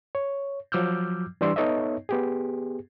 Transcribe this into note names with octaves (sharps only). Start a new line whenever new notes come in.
C#5
F3 F#3 D6 E6 F6 G6
E3 G3 D4 D5 C6 E6
B3 D#4 A4 C#5 D#5 E5
B3 G4 G#4